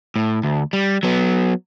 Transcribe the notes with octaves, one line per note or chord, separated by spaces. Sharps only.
A2
D2
G3
F#3 B3